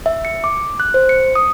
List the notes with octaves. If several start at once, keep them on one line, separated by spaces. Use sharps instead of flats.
E5
C#7
D6
F#6
C5
C#7
D#6